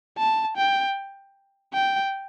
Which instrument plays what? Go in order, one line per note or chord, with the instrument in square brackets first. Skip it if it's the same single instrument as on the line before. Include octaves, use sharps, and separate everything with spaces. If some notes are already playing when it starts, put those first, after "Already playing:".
[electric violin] A5
G5
G5